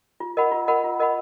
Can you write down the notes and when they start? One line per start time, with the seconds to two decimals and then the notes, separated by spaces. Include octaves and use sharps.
0.20 F4
0.37 A#4 D#5 F#5 B5
0.52 F4
0.68 A#4 D#5 F#5 B5
0.84 F4
1.00 A#4 D#5 F#5 B5